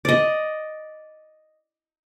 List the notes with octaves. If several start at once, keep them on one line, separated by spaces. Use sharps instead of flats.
D5 D#5